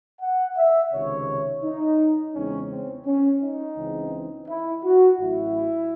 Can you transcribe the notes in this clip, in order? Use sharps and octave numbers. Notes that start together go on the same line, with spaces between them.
F#5
E5
C#2 C3 D#3 C#5
D#4
E2 C#3 G#3 C4 C#4
C4
C#4
D#4
C#2 C#3 E3 C4
E4
F#4
A1 A2 F#3 E4